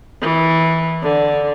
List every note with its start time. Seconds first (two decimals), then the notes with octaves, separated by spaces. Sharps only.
0.22 E3
1.03 D3